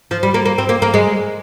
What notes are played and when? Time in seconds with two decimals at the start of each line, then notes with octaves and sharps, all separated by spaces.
0.11 F3
0.23 G3
0.34 A#3
0.46 A#3
0.58 C4
0.69 A#3
0.82 A#3
0.94 G#3